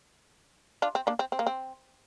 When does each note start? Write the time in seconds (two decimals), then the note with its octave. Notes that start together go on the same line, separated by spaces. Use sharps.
0.82 D4 F4
0.95 C4
1.07 A#3 D4
1.19 C4
1.32 C4
1.39 A#3
1.47 C4